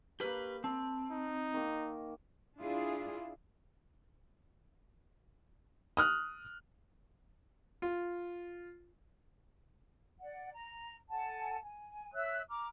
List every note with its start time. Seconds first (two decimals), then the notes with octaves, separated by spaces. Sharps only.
0.20 A#3 G4 B4 B5
0.64 C4 A5
1.11 D#4
1.54 D#3 A#3
2.60 D4 E4 F4 G#4
5.97 D#6 F6 F#6
7.82 F4
10.20 D5 F#5
10.51 A#5
11.09 A4 F#5 G#5 A5
11.63 G#5
12.14 C#5 E5 E6 F#6
12.49 A#5 D6 F6